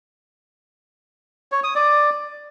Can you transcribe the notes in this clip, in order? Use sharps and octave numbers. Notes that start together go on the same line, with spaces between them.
C#5
D#6
D5